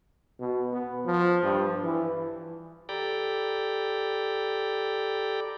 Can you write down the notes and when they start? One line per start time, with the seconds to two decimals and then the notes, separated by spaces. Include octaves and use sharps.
0.40 B2
0.72 B3
1.05 F3
1.43 G2
1.84 E3
2.89 G4 A4 D5 G5 A#5 B5